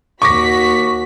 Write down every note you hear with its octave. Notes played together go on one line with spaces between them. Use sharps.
D#2 F#4 C#6 D6 A#6 B6